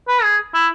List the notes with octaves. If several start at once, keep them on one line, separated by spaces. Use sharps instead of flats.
B4
G#4
E4